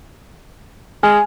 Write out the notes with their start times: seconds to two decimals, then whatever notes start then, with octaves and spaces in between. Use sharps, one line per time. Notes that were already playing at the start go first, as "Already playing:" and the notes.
1.03 G#3 G#5 F6